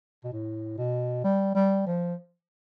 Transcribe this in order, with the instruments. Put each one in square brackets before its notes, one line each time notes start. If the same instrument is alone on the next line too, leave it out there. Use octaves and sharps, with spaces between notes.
[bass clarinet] B2
A2
B2
G3
G3
F3